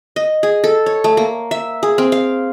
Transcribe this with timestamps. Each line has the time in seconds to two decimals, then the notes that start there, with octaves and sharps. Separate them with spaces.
0.16 D#5
0.43 G#4
0.64 A4
0.86 C#5
1.04 A3
1.17 A#3
1.51 E5
1.83 G#4
1.98 C4
2.12 F5